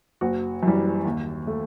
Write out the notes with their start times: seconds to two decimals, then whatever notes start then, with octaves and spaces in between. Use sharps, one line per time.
0.21 F#1 F#4
0.63 F#2 E3 G3
1.05 D#2
1.47 A3